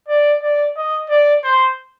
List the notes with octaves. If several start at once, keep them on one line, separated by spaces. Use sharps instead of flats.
D5
D5
D#5
D5
C5